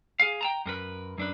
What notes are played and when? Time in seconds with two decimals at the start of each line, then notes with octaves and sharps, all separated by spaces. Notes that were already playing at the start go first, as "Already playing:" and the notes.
0.20 G#4 F5
0.41 G5 A5 A#5
0.65 F#2 A#4 B4
1.18 F#2 D4 B4